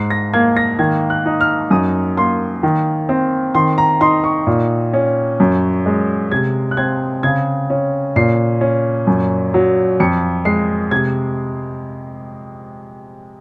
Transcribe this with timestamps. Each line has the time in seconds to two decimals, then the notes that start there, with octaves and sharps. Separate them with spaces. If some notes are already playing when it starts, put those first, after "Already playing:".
Already playing: G#2 C7
0.10 A#6
0.34 A#3 G#6
0.57 A#6
0.79 D#3 G#6
1.10 F#6
1.26 D#4
1.41 F6
1.70 F#2 D#6
2.17 A#3 C6
2.63 D#3
3.09 C4
3.55 D#3 C6
3.78 A#5
4.01 D#4 C6
4.24 C#6
4.47 A#2
4.93 C#4
5.40 F#2
5.86 G#3
6.32 C3 G#6
6.71 F#6
6.77 C4 G#6
7.23 C#3 G#6
7.70 C#4
8.16 A#2 C7
8.61 C#4
9.07 F#2
9.54 F#3
10.00 F2 C#7
10.45 G#3 C7
10.91 C3 G#6